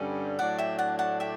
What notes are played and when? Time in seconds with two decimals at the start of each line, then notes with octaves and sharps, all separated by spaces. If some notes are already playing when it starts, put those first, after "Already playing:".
Already playing: G2 D3 G3 C#4
0.39 A2 F#3 A3 D4 D5 F#5
0.58 E5 G5
0.79 F#5 A5
0.99 F#5 A5
1.20 E5 G5